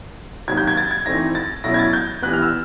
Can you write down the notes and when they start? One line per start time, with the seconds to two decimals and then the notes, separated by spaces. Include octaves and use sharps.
0.48 C3 D#3 F#3 A#3 G#6
0.57 G6
0.67 G#6
0.77 A6
0.91 G#6
1.06 E3 A3 C4 D#4 A#6
1.35 A6
1.64 B2 F#3 A3 C#4 E4 A#6
1.74 G#6
1.79 A6
1.93 G6
2.22 E3 G3 B3 F#6
2.33 F6
2.42 E6